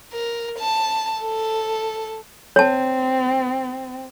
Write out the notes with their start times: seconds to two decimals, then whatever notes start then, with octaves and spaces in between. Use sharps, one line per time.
0.13 A#4
0.59 A5
1.21 A4
2.56 C4 C#5 A5